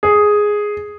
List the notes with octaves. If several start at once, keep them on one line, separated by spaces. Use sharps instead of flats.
G#4